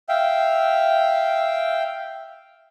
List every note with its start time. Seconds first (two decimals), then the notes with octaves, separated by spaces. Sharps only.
0.09 E5 F5 G5